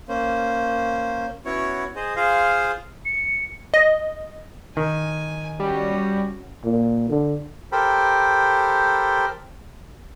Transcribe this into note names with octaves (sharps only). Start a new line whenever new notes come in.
A#3 C#4 C5
B3 C#4 E4 F#4 C#5
G#4 C5 D#5
F4 G#4 C5 F5
C#7
D#5
D#3 G#5
G3 C#4 F#4
A#2
D3
G4 A4 A#4 C5 G5 B5